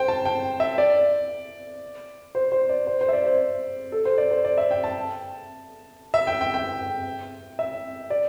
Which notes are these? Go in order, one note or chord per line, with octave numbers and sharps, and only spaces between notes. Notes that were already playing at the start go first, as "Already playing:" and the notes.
Already playing: C5 G5
A5
G5
E5
D5
C5
C5
D5
C5
C5
E5
D5
C5
A4
C5
D5
C5
D5
E5
G5
A5
E5
G5
G5
G5
E5
D5